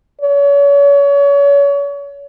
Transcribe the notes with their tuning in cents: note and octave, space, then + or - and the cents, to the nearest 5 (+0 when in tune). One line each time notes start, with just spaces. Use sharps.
C#5 +35